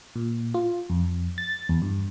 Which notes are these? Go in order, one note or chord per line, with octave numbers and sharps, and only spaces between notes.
A#2
F4
F2
A6
E2
G2